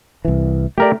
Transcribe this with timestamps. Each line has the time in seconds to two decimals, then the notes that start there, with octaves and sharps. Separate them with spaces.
0.25 C2 E3
0.78 A3 G4 A#4 D5